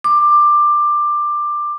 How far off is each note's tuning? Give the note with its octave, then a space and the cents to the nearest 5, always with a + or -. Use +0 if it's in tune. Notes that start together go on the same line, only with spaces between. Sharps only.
D6 +15